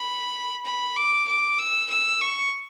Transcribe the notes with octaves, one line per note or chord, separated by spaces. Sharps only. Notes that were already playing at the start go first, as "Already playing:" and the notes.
Already playing: B5
B5
D6
D6
E6
E6
C#6